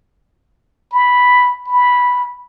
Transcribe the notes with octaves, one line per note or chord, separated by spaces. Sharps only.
B5
B5